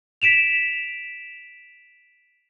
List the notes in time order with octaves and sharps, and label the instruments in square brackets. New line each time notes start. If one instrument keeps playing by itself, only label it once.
[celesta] B6 D7 E7 F7